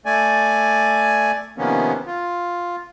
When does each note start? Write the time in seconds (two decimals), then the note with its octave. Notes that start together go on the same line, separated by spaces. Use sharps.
0.06 A3 D5 G#5
1.58 C3 D#3 F3 A#3 B3 C#4
2.06 F4